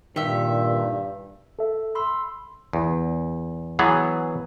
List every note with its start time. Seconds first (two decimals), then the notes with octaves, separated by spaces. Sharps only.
0.16 G2 A#2 D#3 G4 E5
1.59 A4 E5
1.95 B5 C6 E6
2.73 E2
3.79 E3 F#3 B3 G#4